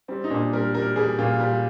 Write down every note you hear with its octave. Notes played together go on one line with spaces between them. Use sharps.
G3 C4
D#4
A#2 D4
G3 A#4
G3 A#4
G3 G#4
A#2 F4
G3